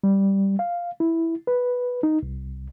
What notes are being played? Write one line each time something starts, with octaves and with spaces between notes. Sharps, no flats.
G3
F5
E4
B4
D#4
C2